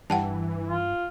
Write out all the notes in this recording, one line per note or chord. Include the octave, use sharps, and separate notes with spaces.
G2 E3 F#5 G5 A5
F4